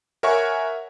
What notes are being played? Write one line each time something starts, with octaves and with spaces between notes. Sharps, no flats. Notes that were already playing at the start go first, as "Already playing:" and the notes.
A#4 C#5 E5 F#5 G#5 C#6